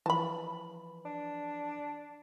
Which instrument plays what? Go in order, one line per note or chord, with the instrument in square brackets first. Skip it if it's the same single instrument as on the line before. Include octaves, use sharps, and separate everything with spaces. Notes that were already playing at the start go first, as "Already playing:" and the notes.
[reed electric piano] E3 F3 B4 [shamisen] A5 B5
[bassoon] D4